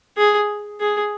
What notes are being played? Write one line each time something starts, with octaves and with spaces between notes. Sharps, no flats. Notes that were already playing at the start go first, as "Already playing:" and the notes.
G#4
G#4